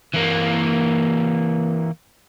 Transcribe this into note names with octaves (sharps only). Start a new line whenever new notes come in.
E3 A#3